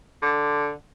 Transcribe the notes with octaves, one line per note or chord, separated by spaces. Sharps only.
D3